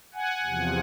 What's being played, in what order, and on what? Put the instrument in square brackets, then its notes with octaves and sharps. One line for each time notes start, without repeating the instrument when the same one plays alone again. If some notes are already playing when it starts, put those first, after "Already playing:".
[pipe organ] F#5 G#5
E2 C3 F3